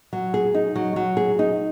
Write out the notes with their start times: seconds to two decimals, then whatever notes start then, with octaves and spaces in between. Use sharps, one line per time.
0.13 F#3
0.34 G#4
0.55 D#4
0.76 F#3
0.96 F#3
1.17 G#4
1.39 D#4